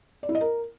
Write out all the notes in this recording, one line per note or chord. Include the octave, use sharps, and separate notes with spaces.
D5
E4
D#5
A#4